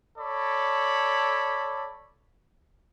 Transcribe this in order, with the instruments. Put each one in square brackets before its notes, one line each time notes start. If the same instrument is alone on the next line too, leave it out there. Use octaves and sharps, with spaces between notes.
[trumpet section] A4 C#5 D5 B5